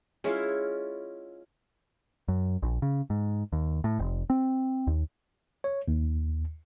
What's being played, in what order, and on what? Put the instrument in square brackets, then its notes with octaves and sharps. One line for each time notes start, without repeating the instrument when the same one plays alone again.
[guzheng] G#3 [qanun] C#4 E4 F4
[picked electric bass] F#2
A#1
C#3
G#2
D#2
A2
F1
C4
D#2
[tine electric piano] C#5
D#2